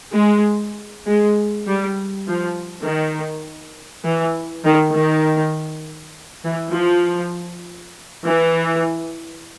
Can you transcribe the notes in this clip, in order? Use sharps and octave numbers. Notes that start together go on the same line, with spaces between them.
G#3
G#3
G3
F3
D#3
E3
D#3
D#3
E3
F3
E3